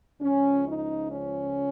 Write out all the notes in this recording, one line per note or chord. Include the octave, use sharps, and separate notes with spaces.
C#2 C#3 F3 C#4
D#4
C#4